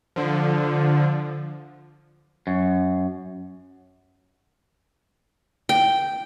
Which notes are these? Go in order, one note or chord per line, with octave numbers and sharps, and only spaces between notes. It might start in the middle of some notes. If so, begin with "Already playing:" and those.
D3 F3
F#2
G5